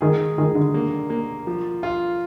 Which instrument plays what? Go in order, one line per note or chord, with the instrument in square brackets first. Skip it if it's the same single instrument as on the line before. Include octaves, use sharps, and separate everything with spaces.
[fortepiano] D#3 [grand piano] G#4
[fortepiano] D#3 [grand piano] G#4
[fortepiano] D3
[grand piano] A#3
A#3
F3
F4